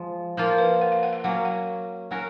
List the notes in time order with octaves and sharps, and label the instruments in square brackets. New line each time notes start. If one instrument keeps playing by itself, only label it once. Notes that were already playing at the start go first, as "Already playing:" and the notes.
Already playing: [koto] F3 G#3 F4
[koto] F3 A#3 F4 [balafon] A#4
[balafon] B4
F#5
F5
F#5
F5
[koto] F#3 A#3 C#4 [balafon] F#5
[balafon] F#5
[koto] F#3 C#4 F#4 A#4